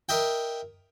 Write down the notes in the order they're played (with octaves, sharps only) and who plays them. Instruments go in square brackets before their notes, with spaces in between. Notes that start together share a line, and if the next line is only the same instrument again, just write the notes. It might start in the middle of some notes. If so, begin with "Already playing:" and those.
[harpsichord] A#4 D#5 E5 G5